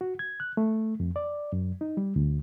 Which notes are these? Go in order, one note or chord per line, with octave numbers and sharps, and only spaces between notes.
F#4
G#6
F#6
A3
F2
D5
F#2
D#4
G3
D2